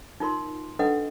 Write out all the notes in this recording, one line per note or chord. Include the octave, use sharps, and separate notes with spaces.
D#4 F4 A#4 C6
D4 A4 B4 D#5 F#5